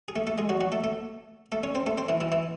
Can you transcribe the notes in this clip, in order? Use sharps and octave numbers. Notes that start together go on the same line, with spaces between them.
G#4
A3 A4
A3 A4
G#3 G#4
F#3 F#4
F#3 F#4
A3 A4
A3 A4
A3 A4
C#4 C#5
C4 C5
A3 A4
C4 C5
E3 E4
E3 E4
E3 E4